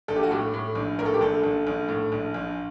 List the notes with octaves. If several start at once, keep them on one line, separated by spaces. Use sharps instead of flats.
A#1 A4
G4
F#4
A2 G4
A2
A#1
A2 A#4
A4
G4
A#1 A4
A#1
A#1
A2
A#1
A#1